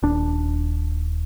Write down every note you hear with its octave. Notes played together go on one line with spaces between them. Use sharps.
D#1 D4